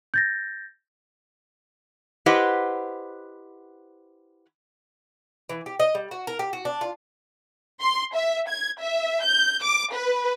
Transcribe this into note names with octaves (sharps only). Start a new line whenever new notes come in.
G6 A6 A#6
E4 G4 B4 C5 D#5 F#5
E3
G4
D#5
G3
F#4
A#4
G4
F#4
D4
F4
C6
E5
G#6
E5
G6
D6
B4